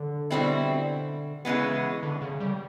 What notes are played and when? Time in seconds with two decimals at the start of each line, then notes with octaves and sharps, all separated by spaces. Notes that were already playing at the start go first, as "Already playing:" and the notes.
Already playing: D3
0.30 B2 G3 C4 E4
1.45 C#3 E3 G#3 B3
2.03 D3
2.22 C#3
2.40 G3